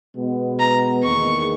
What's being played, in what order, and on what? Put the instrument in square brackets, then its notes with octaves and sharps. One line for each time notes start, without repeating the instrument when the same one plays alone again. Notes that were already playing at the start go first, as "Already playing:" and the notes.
[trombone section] B2 G#3 B3
[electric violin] A#5
[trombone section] E2 D#3 A#3 D#4 G#4 [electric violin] C#6